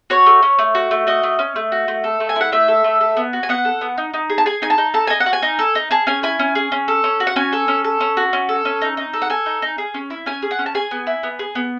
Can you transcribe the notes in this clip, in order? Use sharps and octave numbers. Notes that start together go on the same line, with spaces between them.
F#4 C#5
A3
C#4
A3
F#4
A3
F#4 D#5
A3
C#4
A3
F#4
A3
A4
A3
G#5
E4 F#5
A3 E5
A4
A3
A4
B3
F#4
G#5
B3 F#5
A4
B3
D#4
D#4
G#4
A5
G#4 G#5
D#4 G#5
A5
D#4
A4 A5
D#4 G#5
F#5
F#4
G#5
D#4
A4
D#4
G#4 A5
C#4 G#5
E4 G#5
C#4
G#4
C#4
A4
C#4
F#4
F#5
C#4 G#5
A4
C#4
A4
C#4
F#4
C#4
A4
C#4
D#4
D#4
A4
F#5
A4 G#5
D#4
D#4
G#4
C#4
E4
C#4 G#5
G#4
F#5
C#4
A5
G#4 G#5
B3
E4
B3
G#4
B3